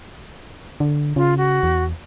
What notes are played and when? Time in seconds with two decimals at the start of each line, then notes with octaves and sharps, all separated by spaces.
0.80 D3
1.16 C#3 F4
1.38 F#4
1.63 E2